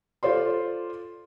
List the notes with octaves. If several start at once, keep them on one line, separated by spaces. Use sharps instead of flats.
F4 A4 C5 D5 C6